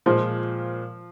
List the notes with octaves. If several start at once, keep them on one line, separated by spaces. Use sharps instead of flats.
A#2 F3 G#3 F4 C5